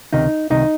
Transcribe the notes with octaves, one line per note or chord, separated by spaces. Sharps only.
C#2 C3 D#3 D#4
C2 C3 D#3 D#4